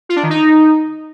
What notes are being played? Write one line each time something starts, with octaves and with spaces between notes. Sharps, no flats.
F4
D4
D#3
D#4